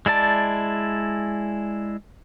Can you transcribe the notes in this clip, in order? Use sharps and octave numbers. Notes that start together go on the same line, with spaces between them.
G#3 E4 D5 A5